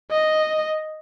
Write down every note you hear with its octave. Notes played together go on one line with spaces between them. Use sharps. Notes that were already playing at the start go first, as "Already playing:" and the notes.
D#5